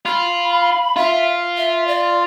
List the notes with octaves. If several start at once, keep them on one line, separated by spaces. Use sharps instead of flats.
F4 B5
F4 E5
E5
D5